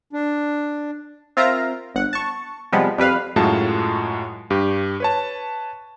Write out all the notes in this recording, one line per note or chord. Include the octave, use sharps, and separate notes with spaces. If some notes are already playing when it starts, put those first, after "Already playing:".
D4
C4 F4 A#4 E5 F5 A#5
G1 F#5
A5 C#6
C3 F3 G3 G#3 B3
F2 G3 B4 F5
F#2 A2 G#3 F4 F#4 A5
G2 G4
B4 C#5 A5